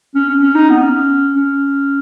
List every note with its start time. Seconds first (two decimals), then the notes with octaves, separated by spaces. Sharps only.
0.15 C#4
0.29 C#4
0.42 C#4
0.55 D#4
0.70 B3
0.82 C#4
1.36 C#4